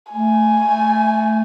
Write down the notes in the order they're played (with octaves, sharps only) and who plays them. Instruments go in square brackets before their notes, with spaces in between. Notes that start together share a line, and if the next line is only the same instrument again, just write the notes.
[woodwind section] A3 [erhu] G#5